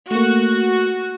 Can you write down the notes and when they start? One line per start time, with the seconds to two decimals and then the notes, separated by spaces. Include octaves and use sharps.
0.11 A3 A#3 F#4